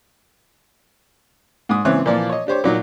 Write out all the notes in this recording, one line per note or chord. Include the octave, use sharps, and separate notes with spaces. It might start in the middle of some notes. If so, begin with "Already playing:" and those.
G#2 D#6
C#2 E3 C4 C#5 E5 F#6
A#2 E3 F3 D5
C#5 D#5
D4 G4 C5 C#5
A#2 F#3 D#4